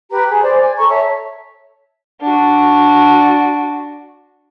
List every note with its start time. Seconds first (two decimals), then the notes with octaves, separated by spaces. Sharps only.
0.11 G4 B4 A#5
0.28 G#4
0.42 C5 D5
0.59 G#5
0.77 A4 A#5 C#6
0.89 C#5 E5 A5
2.21 D4 F#4